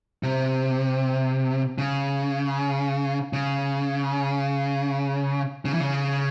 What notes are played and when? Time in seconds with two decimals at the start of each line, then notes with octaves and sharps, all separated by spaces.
0.23 C3
1.78 C#3
3.33 C#3
5.65 C#3
5.73 E3
5.80 C#3